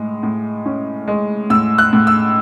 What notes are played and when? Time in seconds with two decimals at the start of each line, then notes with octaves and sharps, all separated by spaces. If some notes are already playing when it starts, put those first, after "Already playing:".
Already playing: A2 G#3
0.23 A2
0.66 C#4
1.08 G#3
1.50 A2 E6
1.78 F#6
1.93 A2
2.07 E6